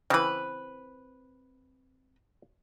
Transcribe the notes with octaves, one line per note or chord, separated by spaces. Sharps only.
C#3 E3 C4 B4